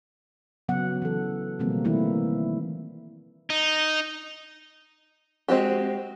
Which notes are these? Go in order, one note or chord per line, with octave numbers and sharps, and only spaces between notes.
C#3 F#3 B3 F#5
E3 A4
B2 D#3 F3 G3 A#3 C4
D#3 E3 A3 A#3 E4
D#4
G#3 C4 F#4 G4